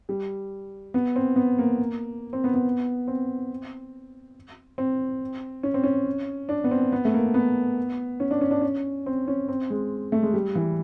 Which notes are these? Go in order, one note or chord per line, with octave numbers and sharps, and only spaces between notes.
G3
B3
C4
B3
A#3
C4
B3
B3
C4
C4
C#4
C4
C#4
D4
B3
C4
B3
A3
A#3
B3
C#4
D4
C#4
D4
C#4
C4
C#4
C4
G#3
A3
G#3
G3
E3